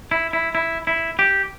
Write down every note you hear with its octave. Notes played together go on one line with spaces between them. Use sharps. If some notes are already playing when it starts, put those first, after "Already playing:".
E4
E4
E4
E4
G4